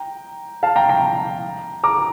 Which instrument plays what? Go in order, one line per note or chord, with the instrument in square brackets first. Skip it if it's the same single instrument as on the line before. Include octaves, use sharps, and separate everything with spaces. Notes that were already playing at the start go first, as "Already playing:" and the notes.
Already playing: [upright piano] G5 A#5
F5 A5
G5 A#5
G5 A#5
A#5 D6